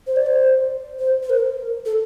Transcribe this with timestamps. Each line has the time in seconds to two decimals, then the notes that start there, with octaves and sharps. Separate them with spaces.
0.07 C5
0.16 D5
0.26 C5
0.99 C5
1.23 C5
1.30 A#4
1.86 A4